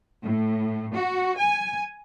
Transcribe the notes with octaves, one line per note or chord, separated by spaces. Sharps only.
A2
F#4
G#5